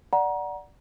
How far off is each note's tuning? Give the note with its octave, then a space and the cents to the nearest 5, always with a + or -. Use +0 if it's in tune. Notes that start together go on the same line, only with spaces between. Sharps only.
D5 +0 F#5 +0 A#5 +25